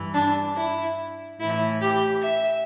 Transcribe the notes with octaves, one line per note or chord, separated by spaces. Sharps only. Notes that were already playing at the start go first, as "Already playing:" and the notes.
Already playing: G2 E3
D4
E4
A2 E3 E4
G4
E5